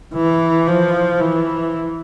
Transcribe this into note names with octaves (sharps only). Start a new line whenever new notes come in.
E3
F3
E3